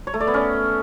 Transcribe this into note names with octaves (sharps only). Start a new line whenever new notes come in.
C#5
A3
D5
B3
C#4